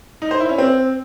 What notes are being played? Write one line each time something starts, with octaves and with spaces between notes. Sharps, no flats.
D#4
C5
E4
C#4
C4